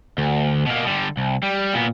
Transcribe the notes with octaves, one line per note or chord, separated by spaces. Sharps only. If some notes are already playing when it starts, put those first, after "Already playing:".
D2
B2 A#3
D3 G3
C2
G3
A#2 B3